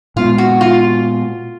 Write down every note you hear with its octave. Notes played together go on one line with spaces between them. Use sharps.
A#2 G#3 B3 F4
F#4
F4